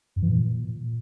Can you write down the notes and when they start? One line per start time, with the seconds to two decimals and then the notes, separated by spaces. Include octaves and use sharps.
0.16 F#2
0.22 E3
0.29 A#2